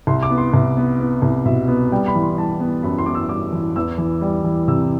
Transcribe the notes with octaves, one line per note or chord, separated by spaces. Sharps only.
C2 C6
D6
B3
C6
C2
B3
B3
C2
B2 E5
B3
G3 G5
B5
E3
C6
G3 A5
B3
F#2 B5
C6
B3 D6
E6
G3 D6
E3
E2 E6
E3
G3
E3
C3 E6